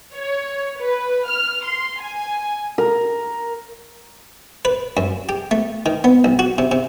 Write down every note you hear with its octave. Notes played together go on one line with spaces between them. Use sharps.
C#5
B4
F6
C6
G#5
A#4
B4
F#2
G4
A3
D#3
B3
B1
F#4
C3
C3